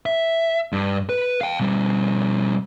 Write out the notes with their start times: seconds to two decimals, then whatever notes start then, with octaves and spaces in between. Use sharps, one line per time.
0.06 E5
0.72 G2
1.09 B4
1.41 F5 G5
1.60 B2 G3